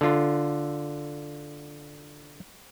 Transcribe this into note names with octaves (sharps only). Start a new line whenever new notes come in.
D3 F4